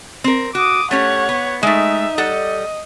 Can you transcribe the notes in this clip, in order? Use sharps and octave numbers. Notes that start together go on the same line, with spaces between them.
C4 A#4
F#4 D6 D#6
A3 C#4 G4 C#5 F#5
B3
G#3 A3 D#4 E5
G3 A4 D#5 F#5